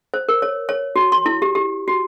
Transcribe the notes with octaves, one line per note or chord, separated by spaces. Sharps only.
C5
A#4
C#5
C#5
F#4
C6
E4
G4
G4
F#4